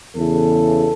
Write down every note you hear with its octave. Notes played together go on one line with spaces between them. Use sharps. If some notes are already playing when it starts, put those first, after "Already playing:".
E2 C#3 E3 A4